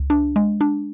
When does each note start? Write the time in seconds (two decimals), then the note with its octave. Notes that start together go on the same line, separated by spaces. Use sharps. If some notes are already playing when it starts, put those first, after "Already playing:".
Already playing: C#2
0.10 D4
0.36 G#3
0.61 D4